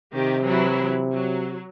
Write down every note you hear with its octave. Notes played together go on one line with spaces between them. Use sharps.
C3 D#3 G4
E3 F#3 E4
F#3